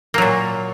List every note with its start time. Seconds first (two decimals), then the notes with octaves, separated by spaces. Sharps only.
0.14 A#3
0.18 F#3
0.22 A#2